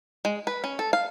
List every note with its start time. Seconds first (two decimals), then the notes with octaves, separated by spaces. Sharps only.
0.25 G#3
0.47 B4
0.64 C#4
0.79 A4
0.93 F5